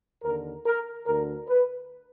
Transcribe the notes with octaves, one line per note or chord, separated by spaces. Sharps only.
D#2 D3 A#4
A#4
D2 D3 A#4
B4